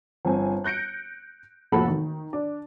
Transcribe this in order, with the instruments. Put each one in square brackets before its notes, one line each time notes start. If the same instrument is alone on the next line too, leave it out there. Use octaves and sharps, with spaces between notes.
[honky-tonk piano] G1 C4 G#5
F#6 G6 A#6 C#7 D7
F1 F3 A#3 F#4 A4 B5
D#3
D4